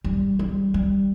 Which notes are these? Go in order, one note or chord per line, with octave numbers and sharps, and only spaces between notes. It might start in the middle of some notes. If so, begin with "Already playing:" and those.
G3
G3
G3